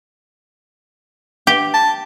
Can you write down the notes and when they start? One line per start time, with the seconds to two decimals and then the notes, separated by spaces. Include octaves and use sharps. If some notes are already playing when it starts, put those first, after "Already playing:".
1.47 G4
1.74 A5